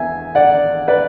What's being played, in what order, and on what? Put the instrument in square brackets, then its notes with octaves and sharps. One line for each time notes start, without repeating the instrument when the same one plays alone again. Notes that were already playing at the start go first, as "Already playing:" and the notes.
Already playing: [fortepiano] E2 E5 G#5
D5 F#5
B4 D5